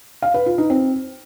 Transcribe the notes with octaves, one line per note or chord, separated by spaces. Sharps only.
F5
B4
F4
D#4
C4